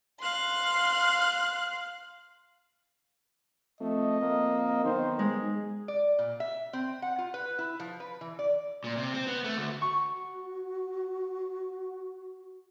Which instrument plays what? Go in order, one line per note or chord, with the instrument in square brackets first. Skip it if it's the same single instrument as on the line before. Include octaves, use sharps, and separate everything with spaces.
[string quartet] F5 C6 F#6
[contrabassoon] F2 [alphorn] A3 [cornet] D#5
[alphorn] A#3
[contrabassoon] B1 [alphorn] D#3 [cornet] C5
[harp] G#3 [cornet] G#4
[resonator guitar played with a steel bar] D5
A#2
E5
C4
F#5
F4
B4
E4
F3
B4
E3
D5
[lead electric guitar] A#2
C3
C4
B3
A3
D2
[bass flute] F#4 [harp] C#6